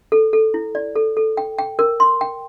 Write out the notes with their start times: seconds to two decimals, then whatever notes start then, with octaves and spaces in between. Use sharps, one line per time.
0.12 A4
0.33 A4
0.54 E4
0.75 D5
0.96 A4
1.17 A4
1.37 G5
1.58 G5
1.79 A#4
2.00 C6
2.21 G5